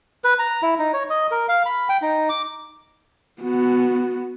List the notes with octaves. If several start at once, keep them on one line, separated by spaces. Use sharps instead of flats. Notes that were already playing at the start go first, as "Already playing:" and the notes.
B4
A#5
E4
D#4
C#5
D#5
A#4
F5
B5
G5
D#4
D6
B3 F#4